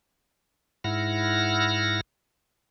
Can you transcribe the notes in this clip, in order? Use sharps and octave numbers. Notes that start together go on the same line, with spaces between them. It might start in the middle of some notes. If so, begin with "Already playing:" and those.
G#2 E4 F#5 F6 A#6